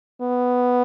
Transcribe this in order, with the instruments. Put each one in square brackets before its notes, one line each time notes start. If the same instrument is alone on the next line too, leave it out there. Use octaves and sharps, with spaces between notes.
[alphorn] B3